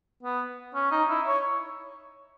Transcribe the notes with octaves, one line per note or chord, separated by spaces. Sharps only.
B3
C#4
D#4
E4
C#5